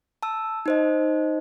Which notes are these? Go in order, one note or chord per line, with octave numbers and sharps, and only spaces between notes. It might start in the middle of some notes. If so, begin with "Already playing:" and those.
A5 E6
D#4 C5 D#5